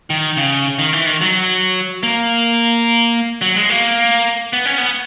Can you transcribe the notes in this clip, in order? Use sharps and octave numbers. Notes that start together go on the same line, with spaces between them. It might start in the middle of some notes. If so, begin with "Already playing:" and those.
D#3
C#3
D#3
E3
D#3
F#3
A#3
F#3
G#3
A#3
B3
C#4
B3